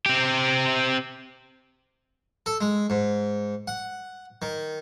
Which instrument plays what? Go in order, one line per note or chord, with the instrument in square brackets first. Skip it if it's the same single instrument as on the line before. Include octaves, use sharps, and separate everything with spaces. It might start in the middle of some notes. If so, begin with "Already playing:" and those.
[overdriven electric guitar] C4 G4
[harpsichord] A4
G#3
G#2
F#5
D#3